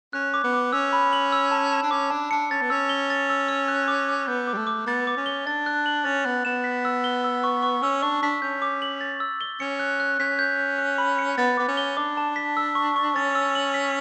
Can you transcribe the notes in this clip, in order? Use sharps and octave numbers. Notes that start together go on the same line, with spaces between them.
C#4 F#6
D6
B3
D6
C#4 E6
B5
F#7
E6
A5
A5
D4
C#4 D6
D4 A5
D4 C#7
C#4 A6
B3
C#4 E6
G7
A6
E6
E6
F#6
D6
D6
B3 G6
D6
G3
A3
D6
B3 A6
D6
C#4
G7
D4 A6
F#6
F#7
C#4 A6
B3 F#6
B3 E7
B6
E6
G7
E6
C#6
C#6
C#4 E6
D4 C#6
D4 B6
C#4 G6
D6
F#7
A6
E6
G7
C#4 C#7
F#6
F#6
C#4 B6
G6
G6
F#6
B5
C#7
B3 A6
B3 D6
C#4
G7
D4 D6
A5
B6
E6
C#6
C#6
C#4 A6
E6
F#7
B6